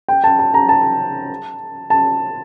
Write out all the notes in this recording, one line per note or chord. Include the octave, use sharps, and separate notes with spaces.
G5
A5
A5
A#5
A5
A5